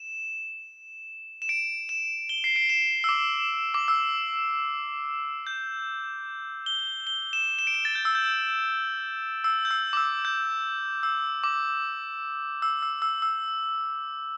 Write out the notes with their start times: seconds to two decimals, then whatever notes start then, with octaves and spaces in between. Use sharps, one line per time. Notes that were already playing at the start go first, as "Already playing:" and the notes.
Already playing: E7
1.42 E7
1.49 D7
1.89 E7
2.29 G7
2.44 C7
2.56 D7
2.69 E7
3.04 E6
3.09 D6
3.74 D6
3.88 E6
5.47 G6
6.66 G7
7.07 G7
7.33 E7
7.59 E7
7.67 D7
7.74 E7
7.85 A6
7.95 G6
8.05 E6
8.15 G6
8.25 G6
9.44 E6
9.65 G6
9.71 E6
9.93 D6
9.97 E6
10.25 G6
11.03 E6
11.44 D6
12.62 E6
12.82 E6
13.02 E6
13.22 E6